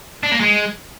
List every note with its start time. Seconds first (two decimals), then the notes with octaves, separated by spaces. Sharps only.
0.23 D4
0.32 A#3
0.40 G#3